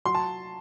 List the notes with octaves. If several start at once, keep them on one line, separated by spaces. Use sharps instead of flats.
F#3 C6
A5